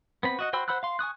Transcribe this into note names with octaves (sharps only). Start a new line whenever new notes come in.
B3 C4 B5
F#4 D#5 F#5
F#4 C5 G5 B5 E6
C5 F#5 B5 E6 F#6
F5 C6
G#5 C#6 D#6 F#6